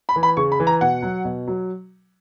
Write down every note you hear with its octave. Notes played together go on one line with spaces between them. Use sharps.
B5
E3
B5
C#3 C#6
B5
E3
A#5
B2 F#5
F#3
B2
F#3